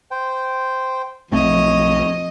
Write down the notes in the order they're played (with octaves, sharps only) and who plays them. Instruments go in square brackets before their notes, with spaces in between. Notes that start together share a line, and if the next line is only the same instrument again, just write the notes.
[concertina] C5 G5
[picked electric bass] B1 A3 C4 [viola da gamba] F2 D#5 [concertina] C#5